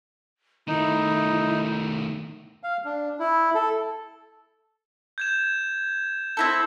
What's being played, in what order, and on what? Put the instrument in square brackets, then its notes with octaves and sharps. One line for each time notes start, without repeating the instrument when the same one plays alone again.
[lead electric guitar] D#3 A3 [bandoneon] D#4 [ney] E4
[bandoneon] F5
D4
E4
A4
[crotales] G6 G#6 E7
[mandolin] C4 E4 A4